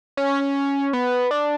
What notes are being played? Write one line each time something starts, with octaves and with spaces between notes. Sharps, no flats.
C#4
B3
D4